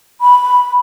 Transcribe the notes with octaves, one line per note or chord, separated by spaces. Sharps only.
B5